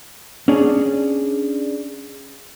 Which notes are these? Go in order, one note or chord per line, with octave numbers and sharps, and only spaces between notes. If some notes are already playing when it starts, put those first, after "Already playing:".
C#4 D4 G#4 D5